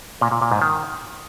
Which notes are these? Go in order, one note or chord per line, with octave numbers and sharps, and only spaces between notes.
A#2
A#2
A#2
G#2
D#3